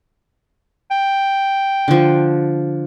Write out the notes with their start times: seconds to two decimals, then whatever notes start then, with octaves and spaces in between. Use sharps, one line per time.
0.91 G5
1.88 D3 F3